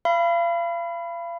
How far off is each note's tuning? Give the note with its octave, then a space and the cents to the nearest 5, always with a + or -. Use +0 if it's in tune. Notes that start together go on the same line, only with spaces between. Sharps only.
F5 -35 B5 +0